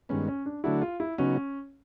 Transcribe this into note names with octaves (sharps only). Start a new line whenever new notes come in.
G2 D#3 G#3 B3 C#4
C#4
D4
D3 F#3 A3 D4 E4 F#4
F4
E4
C#3 F#3 B3 C#4 D#4 F#4